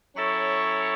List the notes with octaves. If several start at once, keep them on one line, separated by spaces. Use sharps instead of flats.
F#3 C#4 E4 A4 C#5